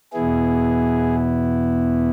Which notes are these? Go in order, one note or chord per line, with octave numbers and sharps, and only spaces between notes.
E2 B2 B3 E4 G#4